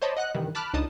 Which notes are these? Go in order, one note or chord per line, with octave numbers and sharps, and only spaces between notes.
C5 C#5 D#5 A5 B5 D6
D#5 F#5 F#6
G2 C3 D#3 E3 G3
A5 B5 D6 F6 F#6
C#2 D4 D#4 A5 D#6